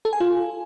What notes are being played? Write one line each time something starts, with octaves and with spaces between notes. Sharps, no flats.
A4
G#5
F4